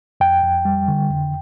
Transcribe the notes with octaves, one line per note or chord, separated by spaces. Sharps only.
F2 G5
F2
G3
D3
F2